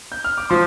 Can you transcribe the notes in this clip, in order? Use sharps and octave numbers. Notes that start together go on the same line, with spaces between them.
G6
F6
D6
F3 C6